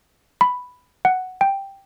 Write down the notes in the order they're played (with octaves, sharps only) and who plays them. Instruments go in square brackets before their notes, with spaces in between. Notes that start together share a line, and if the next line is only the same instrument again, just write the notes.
[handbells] B5
F#5
G5